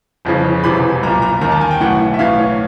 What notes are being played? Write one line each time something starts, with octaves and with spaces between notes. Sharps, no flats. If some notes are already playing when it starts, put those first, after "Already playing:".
G1 F2 C#3 E3
E1 E2 C3 E3 B5
B1 A#2 A#5
A#5
D#2 D#3 A#5
A5
G#5
G5
B1 A2 E3 F#5
E5
B1 A2 E3 F5
C#5